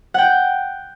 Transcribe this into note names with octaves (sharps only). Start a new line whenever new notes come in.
F#5 G5